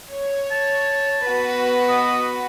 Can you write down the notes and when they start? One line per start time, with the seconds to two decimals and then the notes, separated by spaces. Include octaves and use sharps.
0.11 C#5
0.51 A5
1.27 B3 F#4 B4
1.89 D#5